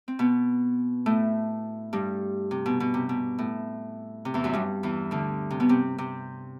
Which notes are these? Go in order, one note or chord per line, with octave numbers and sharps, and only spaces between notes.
C4
B2 B3
A2 A3
G2 G3
C3
B2
B2
C3
B2
A2
C3
E2 E3
F#2 F#3
G2 G3
E2 E3
D2 D3
C3
B2 B3
C3 C4
C3 C4